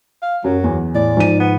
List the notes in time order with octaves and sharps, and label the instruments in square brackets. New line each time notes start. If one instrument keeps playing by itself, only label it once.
[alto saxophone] F5
[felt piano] F#2 [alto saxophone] F#3
[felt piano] E2
[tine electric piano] A2 [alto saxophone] D5
[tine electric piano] G#2 [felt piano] F3 D#7
[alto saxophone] B3